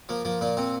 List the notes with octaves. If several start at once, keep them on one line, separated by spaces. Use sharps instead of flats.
F3 A#3
F3 A#3
A#2 A#3
A#2 C4